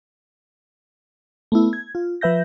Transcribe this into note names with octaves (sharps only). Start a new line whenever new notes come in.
A3 B3 E4
G#6
F4
F3 B4 E5 G6 A#6